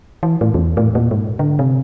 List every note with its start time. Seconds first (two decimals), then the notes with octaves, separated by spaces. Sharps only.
0.23 E3
0.41 A2
0.54 E2
0.77 A2
0.95 A#2
1.11 G#2
1.39 D3
1.59 C3